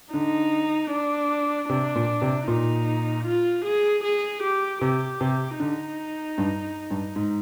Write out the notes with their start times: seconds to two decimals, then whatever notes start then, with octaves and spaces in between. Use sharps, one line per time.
0.13 D3 D#4
0.91 D4
1.69 C3 D4
1.95 A#2
2.22 C3
2.47 A#2 D#4
3.26 F4
3.65 G#4
4.04 G#4
4.43 G4
4.81 C3 G4
5.21 C3
5.60 D3 D#4
6.38 G2
6.91 G2
7.16 G#2